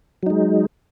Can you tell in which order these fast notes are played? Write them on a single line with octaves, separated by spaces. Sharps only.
F#3 D#4 G#3